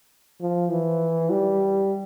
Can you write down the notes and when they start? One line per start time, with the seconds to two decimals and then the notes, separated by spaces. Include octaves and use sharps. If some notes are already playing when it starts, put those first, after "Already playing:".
0.41 F3
0.71 E3
1.30 G3